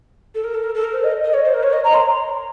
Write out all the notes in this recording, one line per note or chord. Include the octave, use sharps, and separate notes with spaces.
A4
A#4
A4
A#4
A4
A#4
C5
D#5
D#5
C#5
C5
A#4
C#5
D#5
A#5
C6